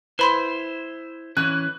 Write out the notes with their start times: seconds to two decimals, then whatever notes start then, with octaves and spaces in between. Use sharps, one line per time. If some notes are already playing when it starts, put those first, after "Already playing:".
0.19 E4 B4 C5 B5 C6
1.37 E3 C#4 F#6